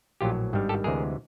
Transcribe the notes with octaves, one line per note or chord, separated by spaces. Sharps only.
A#1 A2 F#3 F4 G4
G#1 G2 D#3 G3
G4 A4
D2 C3 E3 G#3 G#4 A#4